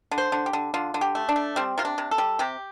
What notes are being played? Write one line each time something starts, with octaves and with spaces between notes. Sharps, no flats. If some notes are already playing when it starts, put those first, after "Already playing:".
D3
C5
D3
G4
D3
D3 F4
D3
G4
A3
D4
A3
G3 C4
C3 F4
D4
C3
A4
G3
C3 G4